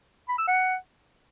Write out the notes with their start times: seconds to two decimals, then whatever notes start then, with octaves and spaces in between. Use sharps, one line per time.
0.29 B5
0.38 E6
0.48 F#5